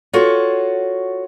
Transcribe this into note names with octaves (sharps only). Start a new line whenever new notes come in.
F4 F#4 A4 C#5